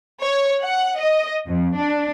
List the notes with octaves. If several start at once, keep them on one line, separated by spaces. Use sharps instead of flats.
C#5
F#5
D#5
F2
D4